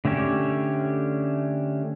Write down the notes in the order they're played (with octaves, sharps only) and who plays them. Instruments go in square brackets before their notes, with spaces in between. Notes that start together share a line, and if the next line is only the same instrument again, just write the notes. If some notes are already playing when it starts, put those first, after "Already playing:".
[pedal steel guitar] D3 A3 C#4 G4 C#5